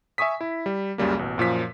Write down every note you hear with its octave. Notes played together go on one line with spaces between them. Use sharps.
E5 G#5 C#6 D#6 B6
E4
G3
C#2 F#2 C#3 G3 A#3
A1 B2
F#2 A#2 F3 B6